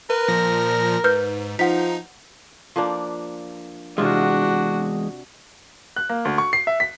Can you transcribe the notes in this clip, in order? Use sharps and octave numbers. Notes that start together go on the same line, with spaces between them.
A#4 B4
A#2 F3 A#6
G#2 B4 F6 G6
F3 D#4 F#5 B6
F3 A#3 D4
E2 C3 G#3 D4 F4 F#4
F#6
A#3
D2
C#6
C7
E5
B6